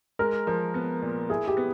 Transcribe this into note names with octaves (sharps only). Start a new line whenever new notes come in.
G#3 A#4
F3 A#4
B3
A#2
E4 G#4
G4
B3